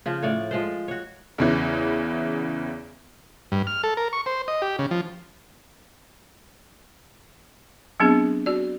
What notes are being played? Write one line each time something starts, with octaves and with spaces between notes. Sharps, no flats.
C#3 F3
A2 C#5 D5
F3 G#3 C5
F#4 C#5
E2 C#3 E3
G2
F6
A4
A#4
C#6
C5
D#5
G4
C#3
F3
F#3 B3 C4 D4 G#4
F#4 D5